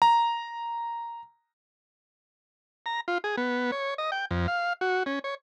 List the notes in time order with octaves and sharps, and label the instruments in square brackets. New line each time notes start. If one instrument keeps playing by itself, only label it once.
[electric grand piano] A#5
[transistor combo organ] A#5
F4
G#4
B3
C#5
D#5
G5
F2
F5
F#4
C#4
C#5